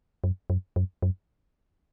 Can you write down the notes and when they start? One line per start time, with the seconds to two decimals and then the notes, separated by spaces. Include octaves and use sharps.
0.24 F#2
0.50 F#2
0.76 F#2
1.02 F#2